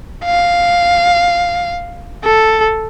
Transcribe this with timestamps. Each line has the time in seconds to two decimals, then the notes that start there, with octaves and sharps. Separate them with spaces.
0.25 F5
2.24 A4